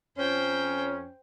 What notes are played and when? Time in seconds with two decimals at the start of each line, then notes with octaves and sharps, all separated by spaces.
0.17 F2 C#4 C5 G5